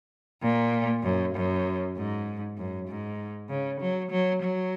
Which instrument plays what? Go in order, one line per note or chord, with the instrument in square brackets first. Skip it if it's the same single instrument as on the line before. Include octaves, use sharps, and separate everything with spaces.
[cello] A#2
F#2
F#2
G#2
F#2
G#2
C#3
F#3
F#3
F#3